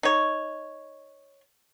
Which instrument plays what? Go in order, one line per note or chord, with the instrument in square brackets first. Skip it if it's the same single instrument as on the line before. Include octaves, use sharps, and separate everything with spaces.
[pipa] D#4 C#5